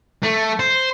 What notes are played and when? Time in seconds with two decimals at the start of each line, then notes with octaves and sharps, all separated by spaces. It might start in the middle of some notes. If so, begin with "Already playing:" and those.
0.23 A3
0.59 C5